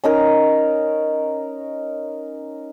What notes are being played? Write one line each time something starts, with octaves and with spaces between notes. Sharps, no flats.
C#4 D#4 A#4